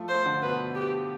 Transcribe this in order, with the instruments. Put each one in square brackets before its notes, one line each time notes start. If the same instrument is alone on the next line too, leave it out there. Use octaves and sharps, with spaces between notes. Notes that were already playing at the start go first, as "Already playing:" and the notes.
Already playing: [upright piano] F3 A3 F4 A4
[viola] C5
[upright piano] D3 D4
[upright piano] B2 B3 [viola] B4
[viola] G4